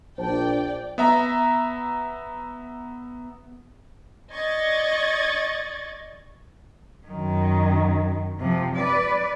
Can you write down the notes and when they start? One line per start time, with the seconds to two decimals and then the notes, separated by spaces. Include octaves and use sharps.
0.18 A#1 C5 D5 G5 A5
0.98 B3 E5 A#5
4.32 D5 D#5 C#6 G#6 A6
7.07 F#2 D#3
8.39 C3 F3
8.76 B4 D5